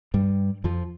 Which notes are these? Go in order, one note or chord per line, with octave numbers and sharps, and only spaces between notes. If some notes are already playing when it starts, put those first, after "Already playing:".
G2 G3
F2 F3